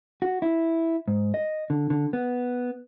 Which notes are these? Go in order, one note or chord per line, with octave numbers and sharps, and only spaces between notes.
F#4
E4
G#2
D#5
D3
D3
B3